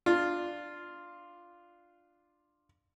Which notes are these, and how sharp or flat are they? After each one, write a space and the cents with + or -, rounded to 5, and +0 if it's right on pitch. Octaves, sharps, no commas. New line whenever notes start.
D4 +15 F4 +0